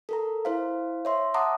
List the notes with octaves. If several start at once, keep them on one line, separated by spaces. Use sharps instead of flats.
A4 A#4 A#5
E4 C5 F5
C#5 E5 C6
E5 F#5 A5 A#5 D6 D#6